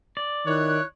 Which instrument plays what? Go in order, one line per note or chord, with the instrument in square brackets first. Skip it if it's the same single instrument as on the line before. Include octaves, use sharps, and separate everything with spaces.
[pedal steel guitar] D5
[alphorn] D#3 [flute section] E4 F#6 [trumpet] C#5